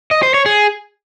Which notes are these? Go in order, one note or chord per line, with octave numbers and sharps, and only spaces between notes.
D#5
C5
C#5
G#4